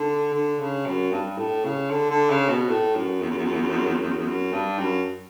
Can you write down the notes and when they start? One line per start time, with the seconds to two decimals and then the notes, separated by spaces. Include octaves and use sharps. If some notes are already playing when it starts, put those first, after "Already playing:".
Already playing: D3
0.33 D3
0.59 C#3
0.86 F#2
1.12 G2
1.38 A2
1.64 C#3
1.90 D3
2.09 D3
2.30 C#3
2.49 B2
2.69 A2
2.95 F#2
3.21 E2
3.30 F#2
3.38 E2
3.45 F#2
3.53 E2
3.61 F#2
3.69 E2
3.77 F#2
3.86 E2
3.94 F#2
4.01 E2
4.09 F#2
4.17 E2
4.26 F#2
4.52 G2
4.79 F#2